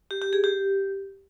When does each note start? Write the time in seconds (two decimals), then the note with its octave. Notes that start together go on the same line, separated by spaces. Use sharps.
0.11 G4
0.22 G4
0.33 G#4
0.44 G4